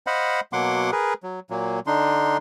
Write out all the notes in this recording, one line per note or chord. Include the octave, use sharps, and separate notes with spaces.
C5 D#5 F5 F#5 B5
B2 F#3 A#3 F#5 C6 D6
G#4 A#4 B4
F#3
A#2 F#3 A#3
D3 D4 D#4 C6